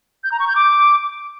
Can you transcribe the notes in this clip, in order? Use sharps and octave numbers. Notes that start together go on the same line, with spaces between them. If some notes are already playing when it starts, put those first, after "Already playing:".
G6
A#5
C#6
G6
D6